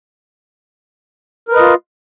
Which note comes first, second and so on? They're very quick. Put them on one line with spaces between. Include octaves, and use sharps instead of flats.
A#4 B4 D#5 F4